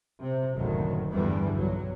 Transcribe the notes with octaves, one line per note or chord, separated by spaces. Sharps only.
C3
F#1 D2 A2 D#3 F#3
E2 G2 D3 E3 G3
B1 F#3